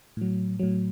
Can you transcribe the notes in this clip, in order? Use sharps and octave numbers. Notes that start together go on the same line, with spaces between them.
A2 F#3
A2 F#3